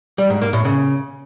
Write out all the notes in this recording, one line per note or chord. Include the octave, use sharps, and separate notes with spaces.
G3
G#2
A#3
A2
C#3